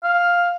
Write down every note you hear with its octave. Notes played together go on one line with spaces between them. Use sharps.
F5